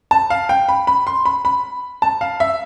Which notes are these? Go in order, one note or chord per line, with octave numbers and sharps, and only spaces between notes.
A5
F5
G5
B5
B5
C6
B5
B5
A5
F5
E5